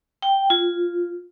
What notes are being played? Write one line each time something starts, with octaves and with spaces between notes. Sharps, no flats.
G5
F4